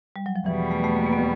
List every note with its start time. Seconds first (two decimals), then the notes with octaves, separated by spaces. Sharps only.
0.16 G3
0.26 F#3
0.36 F3
0.46 E2 B2 E3 G3
0.71 A3
0.84 A3
0.96 A#3
1.07 A#3
1.13 B3